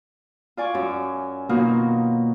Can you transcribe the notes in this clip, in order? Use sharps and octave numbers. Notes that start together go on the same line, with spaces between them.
F4 D5 G#5 C#6
F#2
B2 D#3 F#3 A#3 D#4 F4